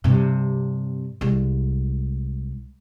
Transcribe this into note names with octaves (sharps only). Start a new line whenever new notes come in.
G2 C3
C2 G#3